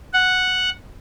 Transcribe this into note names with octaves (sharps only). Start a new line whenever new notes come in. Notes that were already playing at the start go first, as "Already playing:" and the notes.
F#5